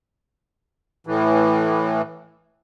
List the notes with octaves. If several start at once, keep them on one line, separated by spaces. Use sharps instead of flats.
A2 E3